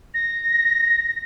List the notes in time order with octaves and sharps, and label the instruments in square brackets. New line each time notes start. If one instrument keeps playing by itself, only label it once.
[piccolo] A#6